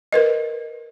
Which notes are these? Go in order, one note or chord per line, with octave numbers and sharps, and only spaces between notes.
A#4 B4 D#5